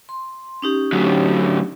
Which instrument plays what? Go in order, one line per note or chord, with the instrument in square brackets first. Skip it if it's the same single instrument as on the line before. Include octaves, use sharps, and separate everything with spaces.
[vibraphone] C6
C#4 D#4 G4
[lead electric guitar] D2 F#3